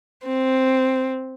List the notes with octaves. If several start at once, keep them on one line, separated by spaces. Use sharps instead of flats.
C4